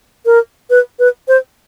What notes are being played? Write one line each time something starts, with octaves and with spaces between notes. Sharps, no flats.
A#4
B4
B4
C5